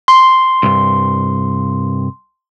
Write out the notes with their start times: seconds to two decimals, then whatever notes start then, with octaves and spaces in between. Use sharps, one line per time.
0.08 C6
0.63 C2 G2